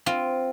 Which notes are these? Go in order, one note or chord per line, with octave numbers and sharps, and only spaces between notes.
C4 F4